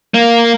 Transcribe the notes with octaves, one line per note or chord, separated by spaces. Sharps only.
A#3